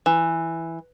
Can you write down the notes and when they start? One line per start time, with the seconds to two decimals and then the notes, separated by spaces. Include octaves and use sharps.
0.06 E3